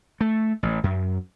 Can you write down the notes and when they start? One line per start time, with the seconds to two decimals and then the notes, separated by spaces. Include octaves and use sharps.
0.21 A3
0.63 A1
0.83 F#2